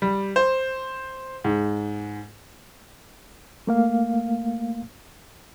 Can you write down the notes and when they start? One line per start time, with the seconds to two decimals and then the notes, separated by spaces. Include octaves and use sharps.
0.02 G3
0.36 C5
1.44 G#2
3.67 A3 A#3 F5